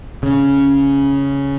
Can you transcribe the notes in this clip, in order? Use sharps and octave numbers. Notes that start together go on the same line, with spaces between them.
C#3